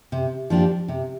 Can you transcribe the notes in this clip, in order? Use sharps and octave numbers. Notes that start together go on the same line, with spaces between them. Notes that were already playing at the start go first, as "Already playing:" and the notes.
C3
F3 A#3 D4 G4
C3